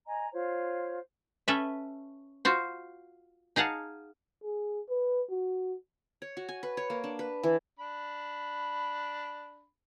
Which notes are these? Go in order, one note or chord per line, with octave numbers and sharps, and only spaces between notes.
D#5 G#5 A#5
F4 C5 C#5
C#4 A4 B4 E5
F4 F#4 C5
D#4 G#4 F5 F#5 A5
G#4
B4
F#4
C#5
F#4
G#5
B4
C#5
A#3
D4
B4
E3
D4 B5